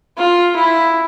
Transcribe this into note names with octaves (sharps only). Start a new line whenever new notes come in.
F4
E4